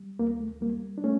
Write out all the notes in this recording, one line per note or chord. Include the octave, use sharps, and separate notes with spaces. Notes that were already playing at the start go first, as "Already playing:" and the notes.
Already playing: G3
D2 A#3
A3
G3 A#3
D4
A3 C#4